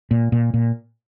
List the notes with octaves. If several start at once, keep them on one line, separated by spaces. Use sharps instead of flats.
A#2
A#2
A#2